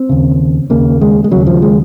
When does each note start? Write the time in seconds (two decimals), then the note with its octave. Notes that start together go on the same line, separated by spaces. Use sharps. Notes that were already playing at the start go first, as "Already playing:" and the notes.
Already playing: C4
0.09 D#2 C#3
0.70 D#2 C#3 A#3
1.01 G#3
1.24 G#3
1.31 D#2 C#3 F#3
1.47 F3
1.62 G#3